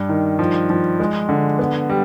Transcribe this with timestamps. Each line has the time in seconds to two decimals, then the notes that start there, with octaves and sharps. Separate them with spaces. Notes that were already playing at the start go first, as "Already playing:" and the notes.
Already playing: G2
0.09 D#3
0.39 F3
0.70 F3
1.00 G#3
1.29 D3
1.59 B3
1.90 G3